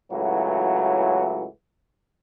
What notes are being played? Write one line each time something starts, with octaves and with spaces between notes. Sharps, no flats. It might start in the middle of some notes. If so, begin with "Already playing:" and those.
C#2 A2 E3 F#3 F#4